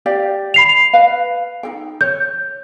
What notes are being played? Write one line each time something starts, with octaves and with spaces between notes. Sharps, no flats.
G4 D5 F5
B5 C7 F7
B4 D#5 F5
D#4 G#4 G5
C#5 G6